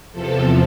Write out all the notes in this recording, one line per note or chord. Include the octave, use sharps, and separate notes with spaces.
E2 C3 F3 A4